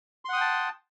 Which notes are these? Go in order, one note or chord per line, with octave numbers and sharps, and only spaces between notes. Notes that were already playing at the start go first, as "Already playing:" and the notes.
F#5 G5 A5 C6 D#6